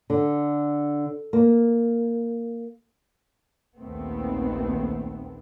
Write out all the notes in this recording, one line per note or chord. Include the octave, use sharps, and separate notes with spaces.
D3
A#3
A#1 D#2 A3 B3 C4